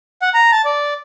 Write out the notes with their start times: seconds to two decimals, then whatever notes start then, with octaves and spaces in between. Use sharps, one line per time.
0.22 F#5
0.34 A#5
0.52 A5
0.65 D5